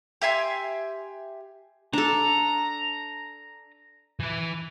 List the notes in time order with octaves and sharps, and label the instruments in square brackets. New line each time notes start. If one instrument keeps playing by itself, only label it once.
[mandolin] G4 E5 G#5 C6
[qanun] D4 A4 [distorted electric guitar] A#5
[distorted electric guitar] E3 E4